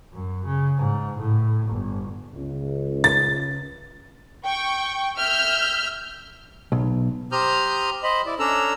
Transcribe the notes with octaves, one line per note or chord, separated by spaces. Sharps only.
F#2
C#3
G#2
A2
G1
C#2
A6
G5 C#6
E5 E6 F6 G6
B1
G4 C5 A#5 D#6 F6 G6
C5 D#5 B5
E4 D5
C#4 D4 A4 A#5 E6